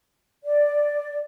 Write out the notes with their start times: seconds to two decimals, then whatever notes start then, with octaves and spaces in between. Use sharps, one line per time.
0.44 D5